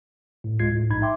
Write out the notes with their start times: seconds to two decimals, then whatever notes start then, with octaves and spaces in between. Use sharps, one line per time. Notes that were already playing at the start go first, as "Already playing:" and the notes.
0.44 A2
0.59 D2 G#3 F4 G#6 C7
0.73 A2
0.90 A#1 G#2 D#4 B5 G#6
1.02 E5 G5 C6 D6